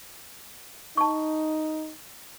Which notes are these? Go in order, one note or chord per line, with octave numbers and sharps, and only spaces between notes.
D#4 A5 C#6